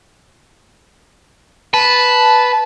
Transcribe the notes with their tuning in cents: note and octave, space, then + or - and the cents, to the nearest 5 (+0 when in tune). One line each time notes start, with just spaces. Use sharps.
B4 +0 A5 -15